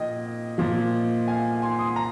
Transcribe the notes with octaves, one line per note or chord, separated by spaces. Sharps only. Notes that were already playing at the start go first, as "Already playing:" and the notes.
Already playing: A#2 F3 D#5 G5
A#2 F3
F5 G#5
G#5 C6
C6 D#6
A#5